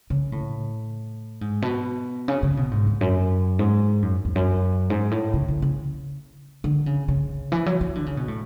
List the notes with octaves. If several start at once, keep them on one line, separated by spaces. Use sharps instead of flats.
C#3
A2
G#2
B2
C#3
C#3
B2
G#2
E2
F#2
G#2
F#2
E2
F#2
G#2
A2
C#3
D3
C#3
D3
C#3
C#3
E3
F#3
E3
D3
C#3
B2
A2